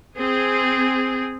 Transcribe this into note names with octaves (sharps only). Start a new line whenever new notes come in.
C4 G#4